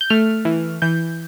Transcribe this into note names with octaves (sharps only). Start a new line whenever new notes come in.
G6
A3 F6
E3
E3 G6